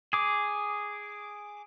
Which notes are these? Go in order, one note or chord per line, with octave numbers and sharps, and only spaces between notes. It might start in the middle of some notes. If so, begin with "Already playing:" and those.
G#4 D6